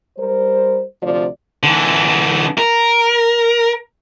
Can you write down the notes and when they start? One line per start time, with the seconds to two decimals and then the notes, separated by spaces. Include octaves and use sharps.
0.18 G3 A#4 C5
1.01 D2 C3 F3 D5
1.63 D3 E3
2.58 A#4